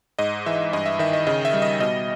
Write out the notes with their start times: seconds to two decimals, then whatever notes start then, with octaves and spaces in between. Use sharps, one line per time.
0.19 G#2 D#5
0.46 E3 E5
0.73 G2 D#5
0.86 E5
0.99 D#3 E5
1.13 D#5
1.27 C#3 D#5
1.45 E5
1.54 G3
1.62 D#5
1.80 B2 D#5